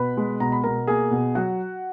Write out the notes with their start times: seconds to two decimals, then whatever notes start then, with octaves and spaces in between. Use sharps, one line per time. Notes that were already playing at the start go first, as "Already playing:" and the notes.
Already playing: B2 B4 B5
0.17 G#3
0.40 B2 A#5
0.52 B5
0.64 B2 A#4 A#5
0.87 A#3 G#4 G#5
1.11 B2
1.35 F#3 F#4 F#5